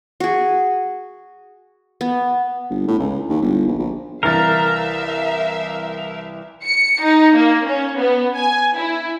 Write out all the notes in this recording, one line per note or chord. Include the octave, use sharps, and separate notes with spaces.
F#4 G#4
B3
G1
A2
C#2
D#2
G1
A#1
A#1
C2 E3 A#4 E5 F5 A6
C#7
D#4
A#3
C#4
B3
G#5
E4